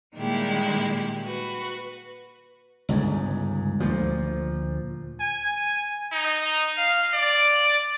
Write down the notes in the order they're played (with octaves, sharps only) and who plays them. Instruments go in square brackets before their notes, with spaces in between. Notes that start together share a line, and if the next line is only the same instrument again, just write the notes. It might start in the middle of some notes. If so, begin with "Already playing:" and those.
[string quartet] A#2 D#3 G3 G#3 E4 G4
F#4 B4
[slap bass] G1 C#2 G#2
D2 A#2 F3
[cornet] G#5
D#4
F5
D5